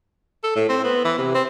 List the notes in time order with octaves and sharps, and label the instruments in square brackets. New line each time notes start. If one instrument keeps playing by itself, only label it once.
[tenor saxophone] A4
A2
C4
B3
E3
C3
C4